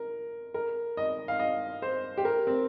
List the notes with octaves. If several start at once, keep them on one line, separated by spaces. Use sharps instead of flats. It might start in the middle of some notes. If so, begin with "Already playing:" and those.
Already playing: A#4
A#4
D#5
F5
D#5
C5
G4
A#4
C4